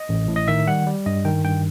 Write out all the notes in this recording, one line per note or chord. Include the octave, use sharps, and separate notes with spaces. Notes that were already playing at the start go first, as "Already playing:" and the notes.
Already playing: D#5
A1
A2
D#5
D#3 E5
G3 F#5
G3
G2 D#5
D#3 G5
G2 G5